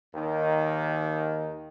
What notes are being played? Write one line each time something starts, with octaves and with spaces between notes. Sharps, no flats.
D#2 D#3